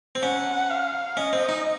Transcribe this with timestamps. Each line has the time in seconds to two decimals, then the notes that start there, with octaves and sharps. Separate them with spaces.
0.15 C4
0.23 C#4 F#5
0.70 F5
1.17 C#4 D#5
1.33 C4
1.49 D#4